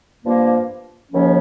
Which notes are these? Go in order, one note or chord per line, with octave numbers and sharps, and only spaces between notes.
G2 F3 A#3
D#2 C#3 F3 A#3 C#4